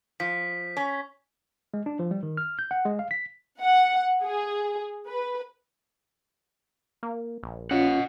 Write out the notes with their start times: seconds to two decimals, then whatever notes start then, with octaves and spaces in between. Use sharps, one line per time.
0.20 F3 B6
0.77 C#4
1.74 G#3
1.86 D4
1.99 F3
2.11 G3
2.23 D#3
2.37 F6
2.59 G6
2.71 F#5
2.85 G#3
2.99 F5
3.11 B6
3.61 F#5
4.23 G#4
5.08 B4
7.03 A#3
7.43 A#1
7.71 C#4 F4 D#5 F#5